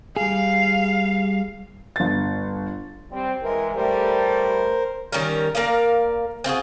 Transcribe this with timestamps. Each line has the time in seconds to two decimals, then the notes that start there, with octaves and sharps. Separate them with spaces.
0.16 G3 G#4 F5
1.96 G1 A6
3.11 G3 C4
3.43 E3 G#3 A#4
3.76 G3 A3 A#4 C5
5.12 D#3 G3 C#4 A#4
5.55 A#3 A#4 D5 F5
6.44 C4 F4 F#4 G#4